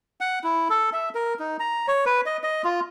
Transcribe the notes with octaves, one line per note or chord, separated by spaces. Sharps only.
F#5
E4
A4
E5
A#4
D#4
A#5
C#5
B4
D#5
D#5
F4